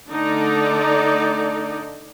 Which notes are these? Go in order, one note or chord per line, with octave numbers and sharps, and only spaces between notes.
D3 A3 D#4 A4 D5